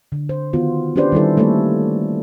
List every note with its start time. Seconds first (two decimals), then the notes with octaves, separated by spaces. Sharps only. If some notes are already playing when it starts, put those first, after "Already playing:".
0.12 D3
0.29 C5
0.53 D#3 B3 F4 F#4
0.96 C#4 D4 G4 B4 C5 D5
1.12 D#3 G3 E4 A4
1.37 G3 A3 A#3 A4 C#5